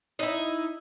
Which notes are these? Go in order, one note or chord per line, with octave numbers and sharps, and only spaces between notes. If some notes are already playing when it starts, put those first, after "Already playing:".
D#4 E4